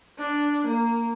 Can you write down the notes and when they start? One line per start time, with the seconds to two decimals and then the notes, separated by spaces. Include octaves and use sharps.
0.19 D4
0.67 A#3